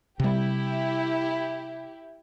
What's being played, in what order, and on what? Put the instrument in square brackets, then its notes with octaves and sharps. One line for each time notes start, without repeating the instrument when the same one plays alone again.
[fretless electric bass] C3 G3 [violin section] E4 G4